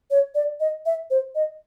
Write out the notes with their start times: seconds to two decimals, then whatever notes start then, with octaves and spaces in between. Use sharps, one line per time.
0.11 C#5
0.35 D5
0.60 D#5
0.86 E5
1.11 C5
1.35 D#5